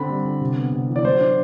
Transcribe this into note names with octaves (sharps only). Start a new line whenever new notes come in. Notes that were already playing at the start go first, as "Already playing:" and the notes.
Already playing: D3 C4 B5
G3
D3
C3
B3
C3
E3
D5
F#3 C5
D4